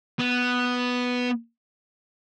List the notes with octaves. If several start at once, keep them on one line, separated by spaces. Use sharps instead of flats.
B3